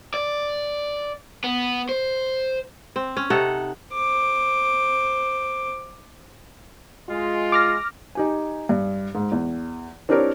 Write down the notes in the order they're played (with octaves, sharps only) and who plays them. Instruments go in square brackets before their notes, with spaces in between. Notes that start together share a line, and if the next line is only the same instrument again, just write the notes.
[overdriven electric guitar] D5
B3
C5
[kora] C4
C#4
C3 D#4 A4 F#5
[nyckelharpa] C5 D6
[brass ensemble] G#3 F4
[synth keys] D6 F6 A#6
[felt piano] D#4 G4 G#5
G2
G#2
E2
C4 D4 E4 G4 A#4 C#5